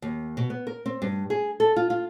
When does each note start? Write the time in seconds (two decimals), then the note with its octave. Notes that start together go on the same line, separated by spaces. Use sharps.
0.02 D#2
0.37 B2
0.50 B3
0.67 A#4
0.86 C4
1.02 G2
1.30 G#4
1.60 A4
1.76 F4
1.90 F4